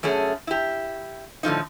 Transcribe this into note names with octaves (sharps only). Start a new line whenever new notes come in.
F#2 A3 C#4 G#4
E4 G4
A2 D3 F3 D#4